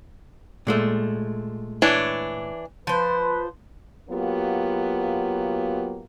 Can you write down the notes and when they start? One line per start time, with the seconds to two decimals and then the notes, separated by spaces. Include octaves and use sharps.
0.67 A#2 G#3 A3
1.82 E3 D4 C#5
2.87 F3 B4 C5
4.09 F#3 A#3 B3 F4 G4